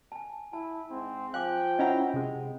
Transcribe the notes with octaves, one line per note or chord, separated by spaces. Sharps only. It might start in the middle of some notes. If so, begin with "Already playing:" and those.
G#5 A5
E4 A5
G#2 C4
F3 F5 G5 G#5 D6 F#6
C#4 E4 D#5 F#5 A#5
C3 G#3